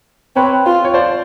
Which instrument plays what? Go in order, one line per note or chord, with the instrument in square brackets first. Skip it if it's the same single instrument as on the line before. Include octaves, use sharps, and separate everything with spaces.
[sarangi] C4 [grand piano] B4 C#5
[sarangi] F4
[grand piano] C#5
C5 D5